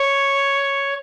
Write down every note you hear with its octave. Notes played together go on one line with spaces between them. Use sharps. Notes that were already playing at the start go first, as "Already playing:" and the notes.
Already playing: C#5